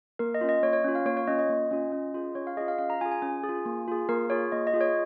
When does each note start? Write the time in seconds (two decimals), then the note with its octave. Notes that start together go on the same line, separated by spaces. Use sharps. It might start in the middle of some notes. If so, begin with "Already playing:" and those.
0.19 A#3 A#4
0.34 D#5
0.41 C#4 F4
0.49 D#5
0.63 A#3 C#5
0.73 C#5
0.84 C#4 F4
0.95 F5
1.06 A#3 C#5
1.17 C#5
1.27 C#4 F4 D#5
1.39 D#5
1.49 A#3
1.71 C#4 F4
1.92 C#4
2.14 F4 G#4
2.35 C#4 C#5
2.47 F5
2.57 F4 G#4 D#5
2.68 F5
2.78 C#4 F5
2.90 A#5
3.01 F4 G#4 G#5
3.12 G#5
3.22 C#4 G#5
3.43 G#4
3.49 F4
3.65 A#3
3.88 F4 G#4
4.09 A#3 A#4
4.30 F4 G#4 C#5
4.52 A#3 D#5
4.67 D#5
4.74 F4 G#4
4.81 C#5